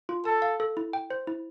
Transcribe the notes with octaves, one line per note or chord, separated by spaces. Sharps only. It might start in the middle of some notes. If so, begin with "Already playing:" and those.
F4
A4 A5
F5
A4
E4
G5
C5
E4